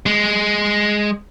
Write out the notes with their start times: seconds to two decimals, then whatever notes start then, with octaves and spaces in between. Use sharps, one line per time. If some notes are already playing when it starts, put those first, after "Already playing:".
0.06 G#3